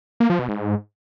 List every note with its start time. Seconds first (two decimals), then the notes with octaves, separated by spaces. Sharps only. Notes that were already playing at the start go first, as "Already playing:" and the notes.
0.20 A#3
0.30 F3
0.39 B2
0.49 G#2